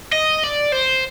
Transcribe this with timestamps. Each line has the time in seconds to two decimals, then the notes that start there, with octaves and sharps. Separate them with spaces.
0.12 D#5
0.43 D5
0.72 C5